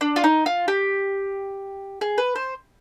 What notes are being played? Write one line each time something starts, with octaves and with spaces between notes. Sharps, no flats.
D4
F4
D#4
F4
G4
G#4
B4
C5